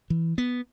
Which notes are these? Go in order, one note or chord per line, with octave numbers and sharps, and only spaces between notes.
E3
B3